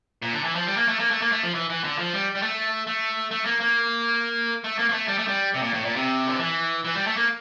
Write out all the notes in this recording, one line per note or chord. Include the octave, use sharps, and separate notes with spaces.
A#2
D3
E3
F3
G3
A#3
A3
A#3
A3
A#3
A3
F3
E3
E3
D3
F3
G3
G3
A3
A3
A3
A#3
A#3
A3
A#3
A#3
A3
G3
A3
G3
C3
A#2
A2
A#2
C3
D3
E3
E3
G3
A3
A#3